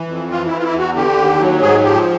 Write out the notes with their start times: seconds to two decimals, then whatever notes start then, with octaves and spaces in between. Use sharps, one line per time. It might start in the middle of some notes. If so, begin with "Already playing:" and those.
Already playing: E3
0.09 F2
0.30 E3 F4
0.46 E4
0.53 E3
0.59 F4
0.63 E4
0.74 E2
0.79 F#4
0.95 D3 G4
1.17 D#2
1.40 F#3
1.61 G#2 G#4
1.83 F3 G4